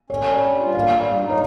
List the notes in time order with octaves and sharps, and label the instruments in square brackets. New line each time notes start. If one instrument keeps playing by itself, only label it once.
[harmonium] C#4 [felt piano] C#5
[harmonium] G3
G2
F4
[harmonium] A#3 [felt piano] F5
[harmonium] G3
G2
D#4
[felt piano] C#5